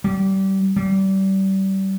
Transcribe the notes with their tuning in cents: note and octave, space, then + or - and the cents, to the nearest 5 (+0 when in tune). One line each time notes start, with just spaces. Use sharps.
G3 -25
G3 -30